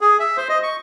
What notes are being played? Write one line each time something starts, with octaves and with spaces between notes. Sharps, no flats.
G#4
E5
C5
D#5
C#6